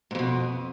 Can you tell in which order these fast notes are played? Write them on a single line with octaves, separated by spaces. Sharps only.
G#2 F2 B2